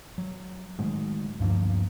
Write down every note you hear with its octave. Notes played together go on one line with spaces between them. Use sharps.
F#3
A2 D#3 F#3 G#3
D2 G2 F3 A#3